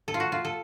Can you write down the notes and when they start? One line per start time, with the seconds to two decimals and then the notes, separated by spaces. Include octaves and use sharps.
0.08 A4
0.14 F4
0.20 F#4
0.32 F4
0.45 A4